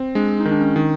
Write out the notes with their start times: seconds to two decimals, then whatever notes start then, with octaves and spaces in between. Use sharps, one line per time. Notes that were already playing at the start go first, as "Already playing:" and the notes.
Already playing: C4
0.15 G#3 D4
0.40 D#4
0.45 D#3
0.51 D4
0.61 C#4
0.76 D#3